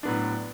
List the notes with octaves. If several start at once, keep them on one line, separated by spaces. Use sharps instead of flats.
A2 F#3 B3 D4